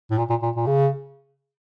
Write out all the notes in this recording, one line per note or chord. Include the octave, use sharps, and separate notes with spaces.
A2
A#2
A#2
A#2
A#2
C#3